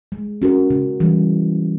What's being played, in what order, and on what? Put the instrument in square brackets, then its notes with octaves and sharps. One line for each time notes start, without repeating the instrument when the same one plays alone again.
[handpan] G#3
C#4 F#4 A#4
C#3
E3 G3